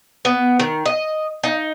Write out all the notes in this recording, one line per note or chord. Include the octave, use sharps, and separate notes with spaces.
B3
D#3
D#5
D#4